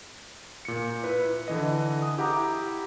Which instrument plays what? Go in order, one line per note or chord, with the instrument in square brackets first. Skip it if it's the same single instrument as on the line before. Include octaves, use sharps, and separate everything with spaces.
[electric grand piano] A#2 C#7
E4 B4
D3 E3 D#5
D#6
E4 G4 F#5 G5 A#5 D6